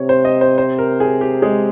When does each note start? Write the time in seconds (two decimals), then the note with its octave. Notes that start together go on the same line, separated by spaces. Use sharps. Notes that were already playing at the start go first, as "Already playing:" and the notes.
Already playing: C3 C#5
0.09 C5
0.25 D#5
0.41 C5
0.58 C5
0.79 A#4
1.00 G#4
1.21 G4
1.42 G#3